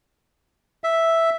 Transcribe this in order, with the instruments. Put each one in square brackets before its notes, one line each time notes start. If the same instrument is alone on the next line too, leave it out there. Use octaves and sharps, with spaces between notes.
[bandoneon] E5